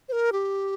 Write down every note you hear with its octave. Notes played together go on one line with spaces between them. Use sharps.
C5
A#4
G4